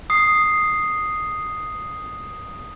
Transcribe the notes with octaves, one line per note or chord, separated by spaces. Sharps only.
D#6 C7